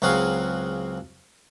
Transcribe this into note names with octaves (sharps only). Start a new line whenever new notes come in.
C#2 F#3 C4 F#4 G#4 F5